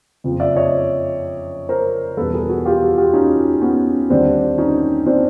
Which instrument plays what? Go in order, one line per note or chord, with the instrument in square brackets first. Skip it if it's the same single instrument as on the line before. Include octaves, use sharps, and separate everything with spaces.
[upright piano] F#1 F2 C#3 F3
D5 E5
C#5 D#5
A#4 C5
E2 B2 G3 A4 B4
G#4 A#4
F#4 G#4
F4 G4
F#4 G#4
F4 G4
C#4 D#4
B3 C#4
D#2 D3 G3 C4 D4
C#4 D#4
C4 D4